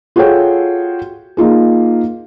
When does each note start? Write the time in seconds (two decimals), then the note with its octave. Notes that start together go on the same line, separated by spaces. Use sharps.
0.16 F4 F#4 G#4 A4 C#5 G5
1.37 A#3 D#4 F4 G#4